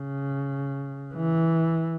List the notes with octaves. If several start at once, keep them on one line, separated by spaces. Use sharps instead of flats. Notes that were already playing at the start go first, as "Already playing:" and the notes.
Already playing: C#3
E3